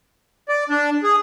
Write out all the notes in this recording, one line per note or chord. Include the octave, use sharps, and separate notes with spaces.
D5
D4
G#4